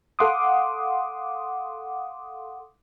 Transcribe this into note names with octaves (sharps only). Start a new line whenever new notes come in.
A4 F5 F#5 C6 D6 D#6